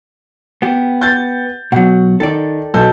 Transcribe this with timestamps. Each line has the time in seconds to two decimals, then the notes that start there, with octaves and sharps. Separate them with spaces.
0.62 B3 G4
1.01 G6 A6
1.72 B2 F#3 F#5
2.20 D#3 A4 D5
2.74 B1 A4 G6